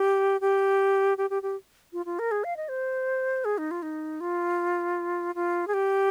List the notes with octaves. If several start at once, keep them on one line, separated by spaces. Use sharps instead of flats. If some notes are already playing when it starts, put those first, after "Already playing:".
Already playing: G4
G4
G4
G4
G4
F4
F4
A#4
G#4
F5
D#5
C5
G#4
D#4
F4
D#4
F4
F4
G#4
G4